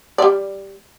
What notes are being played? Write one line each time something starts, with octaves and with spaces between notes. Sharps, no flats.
G3 D5